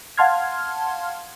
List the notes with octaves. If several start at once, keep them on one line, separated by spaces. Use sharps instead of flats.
F5 F#5 A5 C6 F6 G#6